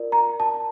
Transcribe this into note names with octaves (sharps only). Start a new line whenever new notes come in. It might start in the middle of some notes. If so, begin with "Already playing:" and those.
Already playing: F4 A#4 D5
A#5
A5